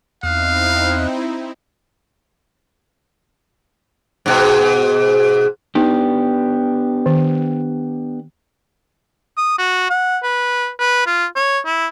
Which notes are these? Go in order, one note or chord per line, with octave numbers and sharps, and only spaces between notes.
E2 C4 D#4 E4 F5 F#6
G#2 B2
B3 D4 D#4 G4
D#3
D#6
F#4
F#5
B4
B4
F4
C#5
E4